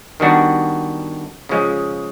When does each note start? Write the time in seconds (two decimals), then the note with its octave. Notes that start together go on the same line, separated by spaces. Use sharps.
0.20 D#3 G3 B3 D4 F#4
1.49 C#3 F3 G#3